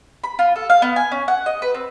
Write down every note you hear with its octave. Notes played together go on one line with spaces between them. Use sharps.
B5
F4
A4
F5
B3
G#5
C#4
F#5
D#5
B4
C4